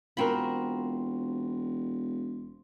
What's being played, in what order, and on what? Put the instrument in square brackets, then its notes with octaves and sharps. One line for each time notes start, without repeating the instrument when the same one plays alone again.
[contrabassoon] E1 [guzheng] C4 B5 [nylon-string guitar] F4 F#4 A#4